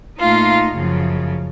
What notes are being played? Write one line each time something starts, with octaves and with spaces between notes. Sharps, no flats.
A#2 A3 D#4 F4 F5
F#2 C#3 F3